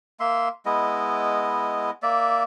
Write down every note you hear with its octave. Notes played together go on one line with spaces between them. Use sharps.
A#3 E5 C6
G#3 B3 E4 D#5
A#3 D5 E5